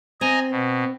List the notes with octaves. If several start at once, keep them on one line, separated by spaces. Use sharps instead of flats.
C4 D#5 G#5 A#5
B2